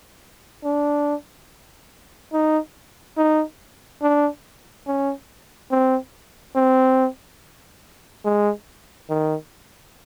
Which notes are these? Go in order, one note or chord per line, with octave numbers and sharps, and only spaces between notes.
D4
D#4
D#4
D4
C#4
C4
C4
G#3
D#3